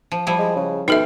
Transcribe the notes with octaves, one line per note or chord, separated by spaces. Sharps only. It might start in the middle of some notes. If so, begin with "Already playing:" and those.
F3
F3 G3 E4
G#3
C#3
B2 D#4 A4 E5 G5